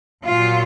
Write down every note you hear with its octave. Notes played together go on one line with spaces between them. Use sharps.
A#2 F#3 F4